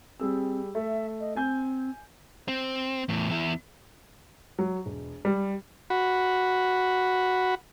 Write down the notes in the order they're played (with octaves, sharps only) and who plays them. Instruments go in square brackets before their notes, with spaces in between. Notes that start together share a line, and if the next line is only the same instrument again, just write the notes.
[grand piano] G3 G#4 E6 [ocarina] C4
[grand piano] A3 [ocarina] E5
[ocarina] D#5
[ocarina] C4 [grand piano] G#5 G6
[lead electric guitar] C4
E2 A2
E2 E4
[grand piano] F#3
E1
G3
[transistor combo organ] F#4 B5